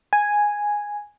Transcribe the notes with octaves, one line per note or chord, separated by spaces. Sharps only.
G#5